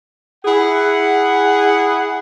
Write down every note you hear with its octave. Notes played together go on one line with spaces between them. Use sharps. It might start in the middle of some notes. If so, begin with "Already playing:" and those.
E4 G#4 F#5